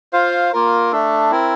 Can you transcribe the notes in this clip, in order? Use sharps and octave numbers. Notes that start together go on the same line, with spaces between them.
F4 C5 F5
A#3 F4 A#4
A3 D4 A4
C4 E4 A#4